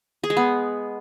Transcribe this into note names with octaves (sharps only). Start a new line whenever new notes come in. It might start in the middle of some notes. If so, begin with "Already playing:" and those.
G#4
G#3
B3